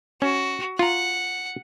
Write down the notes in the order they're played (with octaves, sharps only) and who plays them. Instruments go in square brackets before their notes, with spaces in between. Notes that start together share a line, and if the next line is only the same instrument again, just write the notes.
[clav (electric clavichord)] C#4 [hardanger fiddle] F#4
[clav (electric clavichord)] F4 A#5 [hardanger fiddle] F#5